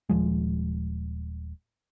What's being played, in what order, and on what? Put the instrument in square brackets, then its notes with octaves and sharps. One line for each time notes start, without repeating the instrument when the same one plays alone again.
[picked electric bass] D#1 F3 G#3